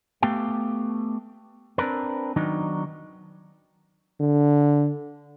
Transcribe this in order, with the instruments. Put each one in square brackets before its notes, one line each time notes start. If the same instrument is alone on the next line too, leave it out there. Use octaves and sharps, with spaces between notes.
[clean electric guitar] A3 B3 G4 F5 G5
C4 D4 A#4 B4
D#3 F#3 B3 D4 D#4
[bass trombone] D3